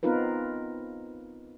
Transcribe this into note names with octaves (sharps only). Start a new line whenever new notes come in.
B3 C4 D#4 F4 A#4 B4